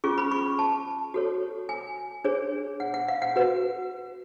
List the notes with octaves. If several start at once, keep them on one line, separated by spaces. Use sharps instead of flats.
C#4 F4 G#4 C#6
B5
C#6
A5
F#4 A4 C#5
G#5
D4 G#4 C#5
F#5
F#5
F5
F#5
F#4 B4